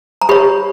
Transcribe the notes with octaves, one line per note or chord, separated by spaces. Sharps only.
A#5
G4 C#5 B5